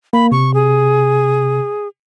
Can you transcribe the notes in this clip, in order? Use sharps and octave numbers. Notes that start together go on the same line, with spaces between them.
A#3 B5
C3 C#6
G#4